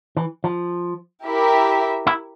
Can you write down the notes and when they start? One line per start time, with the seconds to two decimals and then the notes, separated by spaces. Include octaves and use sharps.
0.17 E3
0.44 F3
1.25 E4 G4 A#4 E5
2.07 E4